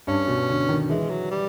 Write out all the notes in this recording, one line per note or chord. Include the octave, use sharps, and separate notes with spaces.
G2 C#4
B2
D3
D#3
E3 G#3
F#3
G3